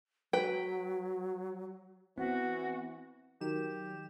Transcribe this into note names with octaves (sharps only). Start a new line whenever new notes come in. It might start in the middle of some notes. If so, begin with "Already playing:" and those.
F#3 B4 G5
E3 B3 C4 F#4
D#3 F#3 G4 E7